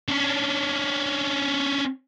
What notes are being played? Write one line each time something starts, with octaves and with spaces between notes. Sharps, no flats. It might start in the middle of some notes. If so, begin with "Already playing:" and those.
C#4 D4